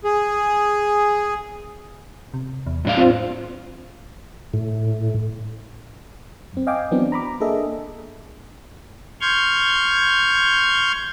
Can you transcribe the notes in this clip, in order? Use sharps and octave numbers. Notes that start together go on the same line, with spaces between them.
G#4
C3
E2
F#2 A2 D4 F5
C4 F4
A2
F#2 C4
D#5 F5 G5 G#5 D6
E3 F#3 B3 C4 D4
A#5 B5 D6
A#3 D4 G#4 A4 D#5 E5
C6 C#6 F6 G6 G#6